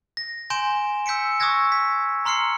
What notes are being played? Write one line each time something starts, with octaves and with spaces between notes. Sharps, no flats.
A#6
G#5 C6 G6 D7 E7 G7
E6 G6 B6 C#7 D7
C#6 D#6 E6 F#6 G#6 A#6
B6
A#5 C6 F6 C7 C#7